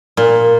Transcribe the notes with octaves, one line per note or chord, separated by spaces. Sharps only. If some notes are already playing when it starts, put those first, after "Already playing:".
A#2